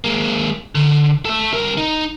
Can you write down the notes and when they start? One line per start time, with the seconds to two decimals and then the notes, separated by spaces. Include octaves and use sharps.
0.04 G#3 A#3
0.75 D3
1.25 A4 E5
1.52 C2 A#4
1.78 D#4